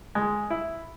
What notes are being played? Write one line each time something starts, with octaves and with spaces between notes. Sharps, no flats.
G#3
E4